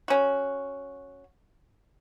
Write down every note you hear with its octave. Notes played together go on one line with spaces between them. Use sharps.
C#4 F#4